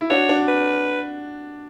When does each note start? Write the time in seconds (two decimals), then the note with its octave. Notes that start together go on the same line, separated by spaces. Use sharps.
0.01 E4
0.10 D4 F#4 C#5
0.29 D4 F#4
0.48 B4